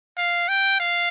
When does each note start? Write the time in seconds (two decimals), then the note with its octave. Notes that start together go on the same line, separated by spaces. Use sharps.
0.18 F5
0.48 G5
0.80 F5